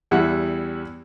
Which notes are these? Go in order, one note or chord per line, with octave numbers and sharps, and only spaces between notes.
E2 G3 E4 F#5